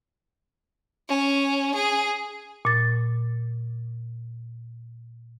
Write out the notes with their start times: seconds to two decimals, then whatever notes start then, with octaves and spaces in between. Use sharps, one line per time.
1.09 C#4
1.75 G#4
2.65 A#2 A6